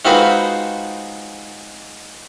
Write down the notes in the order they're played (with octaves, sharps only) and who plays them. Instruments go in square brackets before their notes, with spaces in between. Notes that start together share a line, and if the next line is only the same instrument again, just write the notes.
[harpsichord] G#3 C4 D#4 F4 F#4 B4